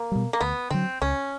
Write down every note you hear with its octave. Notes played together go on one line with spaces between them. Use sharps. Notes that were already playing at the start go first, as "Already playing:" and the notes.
Already playing: A#3
B2 G3
A#3
D2 B3
D3 F#3 C4
C#2 C#4